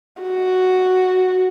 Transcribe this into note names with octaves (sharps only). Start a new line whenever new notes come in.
F#4